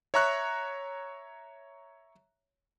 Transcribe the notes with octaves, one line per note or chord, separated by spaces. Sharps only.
C#5 E5 A#5 C#6 F#6